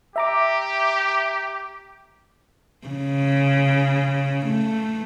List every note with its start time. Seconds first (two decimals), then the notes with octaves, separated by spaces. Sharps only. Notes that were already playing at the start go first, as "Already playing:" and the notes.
0.16 G4 E5 A#5 D6
2.88 C#3
4.46 A3